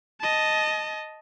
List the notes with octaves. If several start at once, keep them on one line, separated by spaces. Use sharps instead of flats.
D#5 A5